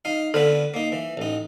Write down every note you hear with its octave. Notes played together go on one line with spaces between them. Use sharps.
D#4 F5
D3 B3 A4 B4
A#3 D#4
E3
A1 D#4